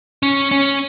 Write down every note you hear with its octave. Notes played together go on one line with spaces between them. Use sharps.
C#4
C#4